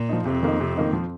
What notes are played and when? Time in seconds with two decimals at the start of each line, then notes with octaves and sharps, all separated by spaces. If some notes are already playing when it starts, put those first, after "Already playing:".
Already playing: A#2
0.09 F3 D#4
0.26 F2 C3
0.43 D#3 A#3 D#4
0.60 C3
0.77 D#3 A#3 D#4
0.93 F3